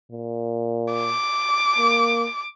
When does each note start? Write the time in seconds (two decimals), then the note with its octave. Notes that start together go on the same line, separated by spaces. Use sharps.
0.12 A#2
0.93 D6
1.79 A#3